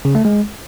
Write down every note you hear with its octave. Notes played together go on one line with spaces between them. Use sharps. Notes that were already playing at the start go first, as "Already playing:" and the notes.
C#3
A3
G#3